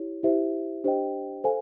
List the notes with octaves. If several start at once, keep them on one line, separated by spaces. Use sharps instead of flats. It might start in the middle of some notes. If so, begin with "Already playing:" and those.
Already playing: E4 G4 C#5
E4 G4 C5 E5
D4 G4 C5 D#5 G5
A4 C5 F5 G#5